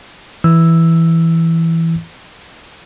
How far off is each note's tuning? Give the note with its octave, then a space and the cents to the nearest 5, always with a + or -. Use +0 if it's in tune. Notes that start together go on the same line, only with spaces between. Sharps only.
E3 +0 E6 +0